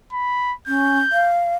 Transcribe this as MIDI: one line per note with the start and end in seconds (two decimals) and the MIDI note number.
0.13 0.53 83
0.67 0.99 61
0.67 1.28 91
1.12 1.55 77